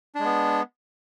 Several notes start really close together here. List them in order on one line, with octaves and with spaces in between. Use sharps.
D4 G#3 B3